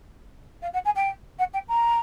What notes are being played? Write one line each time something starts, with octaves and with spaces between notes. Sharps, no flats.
F5
F#5
G#5
G5
F#5
G5
A#5